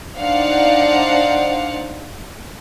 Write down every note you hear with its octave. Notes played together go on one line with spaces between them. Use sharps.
D4 D#4 C5 D5 F5 F#5